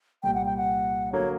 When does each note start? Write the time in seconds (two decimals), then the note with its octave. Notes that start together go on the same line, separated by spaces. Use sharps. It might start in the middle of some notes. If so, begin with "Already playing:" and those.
0.23 C2 A#2 G3 G5
0.34 F#5
0.45 G5
0.57 F#5
1.13 D3 F#3 A#3 C#5